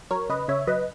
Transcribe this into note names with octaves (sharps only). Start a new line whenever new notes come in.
F#3 A#4 C#5
C#3 B4 D#5
C#3 C#5 E5
F#3 B4 D#5